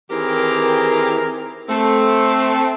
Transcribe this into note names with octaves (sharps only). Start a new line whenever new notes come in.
D#3 E3 C4 G4 G#4 A#4
A3 C4 A4